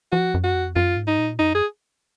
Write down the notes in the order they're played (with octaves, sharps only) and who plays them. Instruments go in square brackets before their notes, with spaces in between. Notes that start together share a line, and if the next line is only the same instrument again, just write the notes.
[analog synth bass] F3 [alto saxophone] F#4
[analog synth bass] F#2
[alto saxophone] F#4
[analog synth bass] F2
[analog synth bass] F#2 [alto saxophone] F4
[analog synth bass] G#2
[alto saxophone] D#4
[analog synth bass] A#2
[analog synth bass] F#2 [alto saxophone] D#4
[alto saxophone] G#4